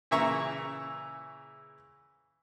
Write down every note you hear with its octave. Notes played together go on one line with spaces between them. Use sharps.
A#2 C#3 E3 E5 A#5 C#6